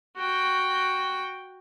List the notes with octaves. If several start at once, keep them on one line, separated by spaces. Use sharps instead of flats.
F#4 G5